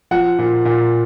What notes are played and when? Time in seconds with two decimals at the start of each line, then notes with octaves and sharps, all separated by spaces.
0.11 F3 F#5
0.39 A#2
0.65 A#2